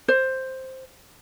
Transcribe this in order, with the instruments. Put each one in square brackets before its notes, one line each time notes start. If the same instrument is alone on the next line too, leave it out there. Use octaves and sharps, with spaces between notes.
[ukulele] C5